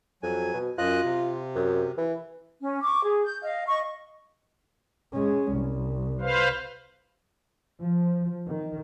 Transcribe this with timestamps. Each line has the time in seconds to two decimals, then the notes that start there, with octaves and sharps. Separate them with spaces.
0.23 F2 F#3 G#5
0.54 B2
0.78 F#2 F4 D#5 F#6
1.05 C3
1.55 F#2
1.98 E3
2.61 C#4
2.82 C#6 D6
3.03 G#4
3.24 G6
3.41 D#5 F5
3.66 D#5 C#6
5.13 G#3 C#4
5.52 C2
6.21 B4 C5 F5
7.81 F3
8.48 D#3